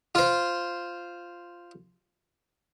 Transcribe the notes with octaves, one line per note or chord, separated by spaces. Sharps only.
F4 C5